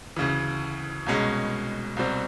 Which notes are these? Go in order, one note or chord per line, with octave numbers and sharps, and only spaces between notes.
D2 C#3 E3
C2 B2 G#3 C#4
C2 B2 G3 C4